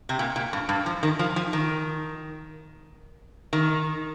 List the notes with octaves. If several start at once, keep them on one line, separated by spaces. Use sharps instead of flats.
C3
A#2
A#2
G2
G2
F3
D#3
F3
F3
D#3
D#3